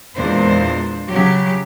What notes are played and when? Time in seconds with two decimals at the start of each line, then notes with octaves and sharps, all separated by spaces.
0.16 E2 A#2 G#3 D4 C5
1.10 C#3 F#3 G4